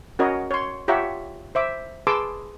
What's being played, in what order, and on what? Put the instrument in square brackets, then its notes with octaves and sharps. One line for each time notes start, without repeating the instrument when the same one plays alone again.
[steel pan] C#4 F#4 A#4 C#5 D#5
C#5 C6
F4 G4 C#5 E5 F#5 A#5
C5 E5 D6
G#4 B4 A5 C6 D6 E6